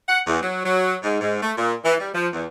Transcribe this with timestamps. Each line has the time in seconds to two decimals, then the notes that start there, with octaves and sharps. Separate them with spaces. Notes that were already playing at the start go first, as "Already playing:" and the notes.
0.08 F#5
0.26 E2
0.42 F#3
0.65 F#3
1.03 G#2
1.21 G#2
1.42 A3
1.56 A#2
1.85 E3
2.00 G3
2.14 F3
2.33 E2